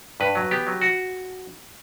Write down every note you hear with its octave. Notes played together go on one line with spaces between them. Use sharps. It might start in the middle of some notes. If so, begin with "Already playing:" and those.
G2 B4
F#3
B3 G4
F#3
F#4